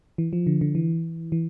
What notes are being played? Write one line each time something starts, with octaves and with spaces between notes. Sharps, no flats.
E3
F3
D3
D3
E3
E3